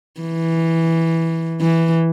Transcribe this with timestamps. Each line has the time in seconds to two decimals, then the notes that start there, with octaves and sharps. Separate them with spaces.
0.21 E3
1.61 E3